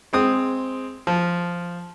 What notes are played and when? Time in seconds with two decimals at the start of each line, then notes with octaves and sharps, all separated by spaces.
0.13 G#3 C4 D#6
1.07 F3